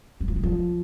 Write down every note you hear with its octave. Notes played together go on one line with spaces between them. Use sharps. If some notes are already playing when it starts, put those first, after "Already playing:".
F#3
F3
D#3
F3